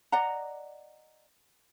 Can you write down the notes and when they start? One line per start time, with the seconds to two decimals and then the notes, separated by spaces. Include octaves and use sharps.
0.12 D5 D#5 F#5 A#5